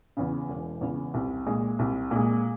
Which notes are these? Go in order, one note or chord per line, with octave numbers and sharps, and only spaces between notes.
E2 C#3
E1
E2 C#3
C2
A#2 G#3
C2
A#2 G#3